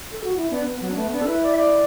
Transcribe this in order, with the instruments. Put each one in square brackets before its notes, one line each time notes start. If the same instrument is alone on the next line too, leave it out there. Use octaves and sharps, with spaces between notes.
[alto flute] A4
F#4
E4
[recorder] B3 [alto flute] D4
[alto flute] B3
[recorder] F#3 [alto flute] B3
[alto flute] D4
[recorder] A3 [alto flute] B3
[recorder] B3 [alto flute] D4
[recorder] A4
[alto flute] E4 [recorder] B4
[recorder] D5
E5
D5